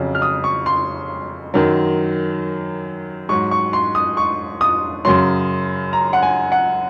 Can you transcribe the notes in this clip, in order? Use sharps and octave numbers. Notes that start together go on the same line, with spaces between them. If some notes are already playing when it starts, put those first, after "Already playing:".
Already playing: F2 C#3 F#3
F6
D#6
C#6
C6
F#2 D#3 F#3
G#2 F#3 C#6
C#6
C6
D#6
C#6
D#6
F#2 C#3 F#3 C6
A#5
F#5
G#5
F#5